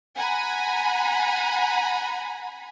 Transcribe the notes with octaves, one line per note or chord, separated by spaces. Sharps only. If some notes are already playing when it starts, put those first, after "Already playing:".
F#5 G#5 A#5 B5